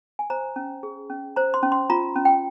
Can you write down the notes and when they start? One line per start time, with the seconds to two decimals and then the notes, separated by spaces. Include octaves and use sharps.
0.19 G#5
0.30 C5 A#5
0.56 C#4
0.83 G#4
1.10 C#4
1.36 C5 A#5
1.54 C6
1.63 C#4
1.72 C6
1.90 F4 A#5
2.16 C#4
2.25 G5